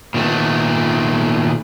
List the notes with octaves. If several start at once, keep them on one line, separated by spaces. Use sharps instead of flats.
A#2 D#3 A3 B3